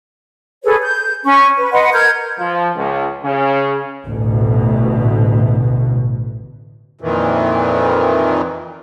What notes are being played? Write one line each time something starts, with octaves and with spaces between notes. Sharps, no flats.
G#4 A4 B4 C#5
G6
C#4 C#6
B4
B4 D#5 F#5 C6
A#4 F6 G6 G#6
F3
C#2
C#3
A1 D2 B2
F2 A#2 D#3 E3